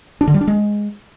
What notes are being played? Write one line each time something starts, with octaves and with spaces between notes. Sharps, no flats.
D4
D3
G3
D4
G#3